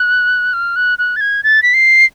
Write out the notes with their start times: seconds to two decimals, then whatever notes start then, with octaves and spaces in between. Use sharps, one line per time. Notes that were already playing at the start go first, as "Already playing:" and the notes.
Already playing: F#6
0.53 F6
0.76 F#6
0.99 F#6
1.16 A6
1.21 G#6
1.44 A6
1.63 B6
1.74 C7